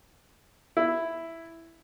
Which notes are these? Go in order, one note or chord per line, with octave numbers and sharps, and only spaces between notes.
E4